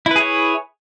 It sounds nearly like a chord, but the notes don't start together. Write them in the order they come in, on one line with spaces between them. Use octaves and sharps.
E4 B4 G#4 C#5